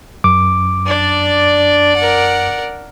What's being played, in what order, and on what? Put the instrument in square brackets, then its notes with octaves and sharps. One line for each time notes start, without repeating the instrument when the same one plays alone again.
[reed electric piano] F#2 [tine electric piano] D6
[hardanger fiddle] D4 [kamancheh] D5
[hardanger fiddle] A#4 F#5